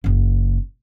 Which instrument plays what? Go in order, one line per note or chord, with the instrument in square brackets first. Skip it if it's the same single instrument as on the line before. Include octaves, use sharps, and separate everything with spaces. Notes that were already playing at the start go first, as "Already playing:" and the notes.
[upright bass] F#1 C#3